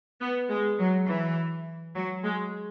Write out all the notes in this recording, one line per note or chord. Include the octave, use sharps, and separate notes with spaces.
B3
G#3
F#3
E3
F#3
G#3